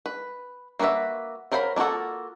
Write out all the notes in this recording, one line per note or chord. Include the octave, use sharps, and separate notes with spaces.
B4
A#3 F#4 G#4 B4 E5
F#3 A#4 C5 F5 B5
A#3 D4 F4 F#4 A4